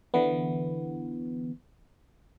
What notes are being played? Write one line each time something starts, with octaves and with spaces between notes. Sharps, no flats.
D3 E3 B3